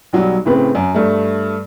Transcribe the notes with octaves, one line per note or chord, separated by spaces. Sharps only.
B1 F#3 G3
A2 C#3 C4 B4
F#2
G2 A3